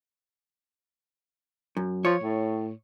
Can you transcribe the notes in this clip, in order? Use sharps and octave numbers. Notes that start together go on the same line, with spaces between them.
F#2
F3 C#5
A2